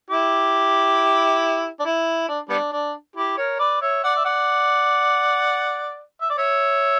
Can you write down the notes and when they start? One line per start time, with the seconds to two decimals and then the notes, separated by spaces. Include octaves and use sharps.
0.10 E4 G4
1.80 D4
1.85 E4
2.28 D4
2.49 G3 B3 D4
2.73 D4
3.16 E4 G4
3.37 A#4 C#5
3.59 B4 D5
3.81 C#5 E5
4.04 D5 F#5
4.16 E5
4.25 D5 F#5
6.21 E5
6.30 D5
6.38 C#5 E5